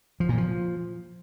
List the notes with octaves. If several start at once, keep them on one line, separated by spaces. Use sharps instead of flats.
F3
A#2
F3